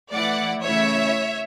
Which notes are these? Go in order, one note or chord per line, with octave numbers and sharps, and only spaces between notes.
E3 A3 E4 D5 F#5
C#3 E3 A3 C#4 E4 C#5 E5